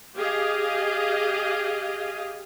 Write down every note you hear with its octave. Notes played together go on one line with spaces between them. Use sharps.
G4 G#4 D#5 F5